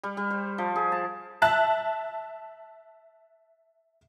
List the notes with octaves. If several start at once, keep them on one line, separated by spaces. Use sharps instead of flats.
G3
G3
C5
F3
G#4
A5
E5 A5 F#6